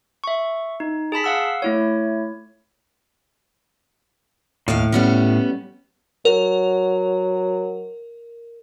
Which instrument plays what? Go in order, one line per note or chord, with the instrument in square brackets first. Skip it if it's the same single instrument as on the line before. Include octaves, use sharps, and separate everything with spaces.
[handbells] E5 C#6
D#4
G#4 A5 B5 B6
F5 F#5 E6
A3 E4 C#5
[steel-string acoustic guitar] D#2 F5 [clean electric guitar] A2
[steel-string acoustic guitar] G3 B3 C#4
[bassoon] F#3 [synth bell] A#4